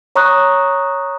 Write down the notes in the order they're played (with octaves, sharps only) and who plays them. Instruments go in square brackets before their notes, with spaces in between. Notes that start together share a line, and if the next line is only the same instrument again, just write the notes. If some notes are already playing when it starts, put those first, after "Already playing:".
[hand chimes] C#5 A#5 C#6 D#6 F#6